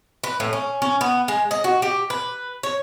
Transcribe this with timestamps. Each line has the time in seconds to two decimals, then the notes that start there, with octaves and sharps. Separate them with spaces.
0.24 B4
0.40 A2
0.53 C#4
0.82 C#4
1.01 B3
1.28 G#3
1.51 D#5
1.64 F#4
1.82 G4
2.10 B4
2.63 C#5